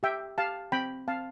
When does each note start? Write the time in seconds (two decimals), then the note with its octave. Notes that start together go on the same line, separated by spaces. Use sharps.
0.03 G4 E5 G5
0.38 G4 F5 A5
0.72 C4 G5 B5
1.08 C4 F5 A5